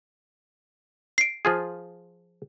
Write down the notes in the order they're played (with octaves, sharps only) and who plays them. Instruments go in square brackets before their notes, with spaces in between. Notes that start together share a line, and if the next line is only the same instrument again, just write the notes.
[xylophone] C7 D7
[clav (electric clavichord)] F3 F4 G#4